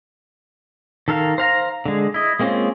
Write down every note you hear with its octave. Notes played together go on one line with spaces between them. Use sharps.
D#3 A4 A#4 F5
C5 F5 A#5
D3 G#3
E4 D#5
G#3 A#3 C4 C#4 F4